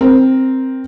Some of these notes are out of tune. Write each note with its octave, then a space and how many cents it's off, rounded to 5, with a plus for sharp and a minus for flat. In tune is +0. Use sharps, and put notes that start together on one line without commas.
C4 +0 A#4 +5